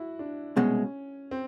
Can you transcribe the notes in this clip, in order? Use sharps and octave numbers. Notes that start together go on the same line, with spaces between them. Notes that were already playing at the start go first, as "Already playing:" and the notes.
Already playing: E4 F#4
D4
C2 B2 G#3 C#4
C4